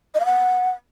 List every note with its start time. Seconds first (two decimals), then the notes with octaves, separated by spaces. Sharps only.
0.15 D#5
0.20 F5
0.26 F#5